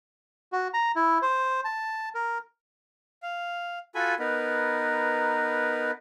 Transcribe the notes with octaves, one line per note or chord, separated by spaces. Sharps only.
F#4
A#5
E4
C5
A5
A#4
F5
F4 F#4 A4 G#5 B5
B3 D#4 A#4 B4